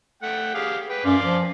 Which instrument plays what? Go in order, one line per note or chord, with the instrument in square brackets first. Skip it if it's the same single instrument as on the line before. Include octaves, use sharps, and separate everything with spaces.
[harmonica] A3 F#5 G5
G4 G#4 F5
B4 G5
[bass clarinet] F#2 [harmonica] D5 F5 C6
[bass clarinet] F3